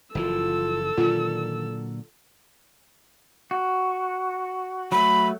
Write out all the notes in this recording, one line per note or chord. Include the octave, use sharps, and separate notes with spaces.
F#1 E3 F3 F4 A4 E6
A#2 D3 D#3 F#3 F4
F#4
F#3 A3 B5